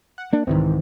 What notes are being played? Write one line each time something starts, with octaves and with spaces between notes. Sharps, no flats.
F#5
A#3 D4
C2 G#2 D#3 E3 C4